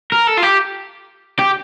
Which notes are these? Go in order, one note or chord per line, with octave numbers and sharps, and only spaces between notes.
A#4
A4
F4
G4
G4